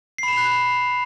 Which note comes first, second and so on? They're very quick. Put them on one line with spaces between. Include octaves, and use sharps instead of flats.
C7 B5 E7 F7 F#6